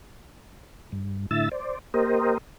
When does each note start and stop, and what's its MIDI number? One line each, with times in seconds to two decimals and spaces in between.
0.92 1.26 43
1.31 1.49 45
1.31 1.49 50
1.31 1.49 64
1.31 1.49 76
1.31 1.49 88
1.31 1.49 93
1.52 1.79 72
1.52 1.79 74
1.94 2.38 58
1.94 2.38 67
1.94 2.38 70
1.94 2.38 72
1.94 2.38 75